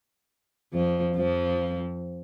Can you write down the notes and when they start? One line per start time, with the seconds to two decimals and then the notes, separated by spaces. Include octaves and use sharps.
0.73 F2 F3
1.16 F2 F3